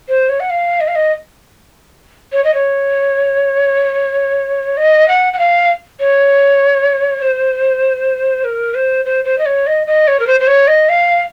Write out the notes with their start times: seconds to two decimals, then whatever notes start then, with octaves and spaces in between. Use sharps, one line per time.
0.09 C5
0.29 C#5
0.40 F#5
0.50 F5
0.81 D#5
0.88 F5
0.95 D#5
2.33 C#5
2.44 D#5
2.54 C#5
4.77 D#5
5.08 F#5
5.33 F#5
5.39 F5
6.00 C#5
7.22 C5
8.44 A#4
8.75 C5
9.05 C5
9.25 C5
9.38 D#5
9.46 C#5
9.67 D#5
9.87 D#5
10.08 C#5
10.20 A#4
10.27 C5
10.40 C5
10.47 C#5
10.68 D#5
10.89 F5